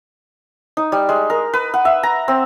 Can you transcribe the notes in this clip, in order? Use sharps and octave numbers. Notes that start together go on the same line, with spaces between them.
D#4
G3
G#3
A#4
B4
F#5
E5
A#5
C4